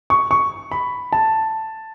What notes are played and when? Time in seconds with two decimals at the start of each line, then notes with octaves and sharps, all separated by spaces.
0.10 C#6
0.31 C#6
0.72 B5
1.13 A5